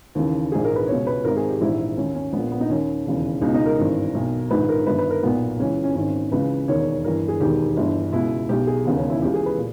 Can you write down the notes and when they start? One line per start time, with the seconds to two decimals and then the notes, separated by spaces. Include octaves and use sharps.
0.15 D#2 C#3 E3
0.52 A#1 G#2 E3 G#4
0.65 A#4
0.76 B4
0.88 C#2 B2 C#5
1.07 B4
1.24 G#1 G#2 D#3 A#4
1.37 G#4
1.49 G4
1.60 A#1 G#2 E3 E4
1.97 D#2 D#3 C#4
2.15 C#4
2.33 A#1 A#2 B3
2.51 B3
2.60 D#4
2.69 D#2 D#3 C#4
3.06 E1 D#2 C#3 E3
3.42 C#2 B2 D#4
3.54 D#4
3.66 A#4
3.78 G#1 G2 E3
4.15 B1 B2
4.51 A#1 G#2 D#3 B4
4.69 A#4
4.87 G1 G2 D#3 B4
4.98 B4
5.10 A#4
5.23 B1 A#2 B3
5.60 C#2 C#3 E3 C#4
5.84 C#4
5.95 G#1 G#2 D#3 C#4
6.31 C#2 C#3 E3 B4
6.68 E1 D#2 D#3 C#5
7.04 G1 G2 E3 A#4
7.28 G#4
7.40 E1 D#2 D#3 G4
7.76 G1 G2 E3
8.12 C#2 B2 E4
8.49 B1 B2 G4
8.67 G#4
8.85 E1 D#2 C#3 B3
8.97 C#4
9.10 E4
9.22 C#2 C#3 E3 G4
9.34 G#4
9.46 B4
9.57 A#2